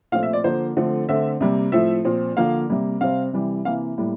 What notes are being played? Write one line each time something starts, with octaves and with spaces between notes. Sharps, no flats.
A#2 F3 A3 C4 F5
E5
D5
D3 F3 A#3 C5
D3 F3 A3 C4
D3 A3 C4 E5
C3 G3 A#3
A2 F3 A3 C4 E5
A#2 F3 C4
D3 F3 A#3 F5
C3 G3 A#3
C3 G3 C4 F5
C3 E3 G3
C3 E3 A#3 F5
A2 G3 A#3